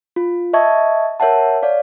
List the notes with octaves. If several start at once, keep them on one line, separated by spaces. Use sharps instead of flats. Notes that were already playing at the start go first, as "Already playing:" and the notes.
F4
D#5 E5 A5 C#6 G#6
A#4 C#5 E5 F#5 A5
C#5 D5 F5